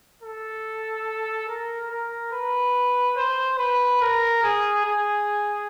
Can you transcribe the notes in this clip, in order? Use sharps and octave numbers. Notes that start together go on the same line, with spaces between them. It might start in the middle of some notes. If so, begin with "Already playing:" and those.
A4
A#4
A#4
B4
C5
B4
A#4
G#4
G#4